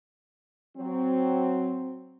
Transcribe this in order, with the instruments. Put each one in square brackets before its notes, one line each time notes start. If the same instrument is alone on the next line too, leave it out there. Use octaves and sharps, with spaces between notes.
[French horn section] F#3 C4